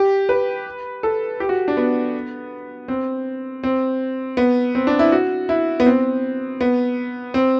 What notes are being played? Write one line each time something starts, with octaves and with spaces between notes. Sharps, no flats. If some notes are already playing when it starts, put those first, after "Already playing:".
Already playing: G4
B4
A4
G4
F#4
D4
B3
C4
C4
B3
C4
D4
E4
F#4
E4
B3
C4
B3
C4